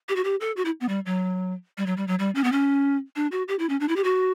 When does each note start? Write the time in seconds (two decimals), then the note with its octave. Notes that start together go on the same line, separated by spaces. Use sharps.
0.09 G4
0.16 F#4
0.24 G4
0.40 A4
0.57 F#4
0.65 E4
0.81 B3
0.88 G3
1.06 F#3
1.78 G3
1.86 F#3
1.97 G3
2.07 F#3
2.19 G3
2.35 C#4
2.44 B3
2.52 C#4
3.16 D4
3.32 F#4
3.48 G4
3.59 E4
3.69 C#4
3.80 D4
3.88 E4
3.96 G4
4.04 F#4